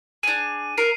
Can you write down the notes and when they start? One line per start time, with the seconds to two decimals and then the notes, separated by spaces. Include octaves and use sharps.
0.23 D4 G#4 D#7
0.78 A#4 C7